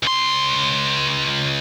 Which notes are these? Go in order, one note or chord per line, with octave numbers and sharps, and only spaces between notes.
C#2 C6